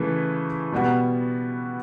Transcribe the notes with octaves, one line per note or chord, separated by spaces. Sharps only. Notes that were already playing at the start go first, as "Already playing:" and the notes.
Already playing: C#3 E3 A3 E4 B4
B2 G3 B3 F#4